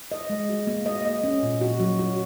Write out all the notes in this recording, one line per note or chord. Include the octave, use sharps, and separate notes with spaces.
D#5
G#3
F#4
A#3
D#5
D#5
C#4
A#2
F#4
F#3
F#4